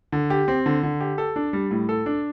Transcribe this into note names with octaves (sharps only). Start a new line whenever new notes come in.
D3
G4
C4
D3
D3
G4
A4
D4
G3
A2
A4
D4